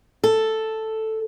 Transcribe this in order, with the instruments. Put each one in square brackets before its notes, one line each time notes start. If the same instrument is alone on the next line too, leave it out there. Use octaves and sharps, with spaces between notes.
[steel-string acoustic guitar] A4